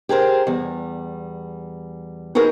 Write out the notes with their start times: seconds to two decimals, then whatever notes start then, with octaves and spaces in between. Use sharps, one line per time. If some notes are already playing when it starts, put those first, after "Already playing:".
0.09 G4 G#4 A#4 C5
0.47 E2 G3
2.35 D#4 F#4 G#4 A#4 B4